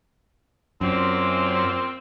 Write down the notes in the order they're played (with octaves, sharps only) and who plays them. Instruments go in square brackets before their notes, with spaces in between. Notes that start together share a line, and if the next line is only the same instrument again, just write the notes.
[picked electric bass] F#2 [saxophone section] A#2 C4